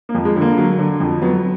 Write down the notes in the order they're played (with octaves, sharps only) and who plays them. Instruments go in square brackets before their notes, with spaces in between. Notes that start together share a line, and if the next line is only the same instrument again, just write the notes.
[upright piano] A#3
F2
G#3
D3
A#3
F#3
D3
F2
F#3 B3